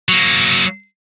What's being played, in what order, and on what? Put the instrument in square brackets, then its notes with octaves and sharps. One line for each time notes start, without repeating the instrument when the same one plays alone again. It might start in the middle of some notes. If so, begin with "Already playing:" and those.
[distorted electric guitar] F#3 A#3